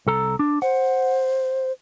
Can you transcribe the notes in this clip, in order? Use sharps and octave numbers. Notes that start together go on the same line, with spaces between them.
C2 A4 A#5
D4
C5 F#5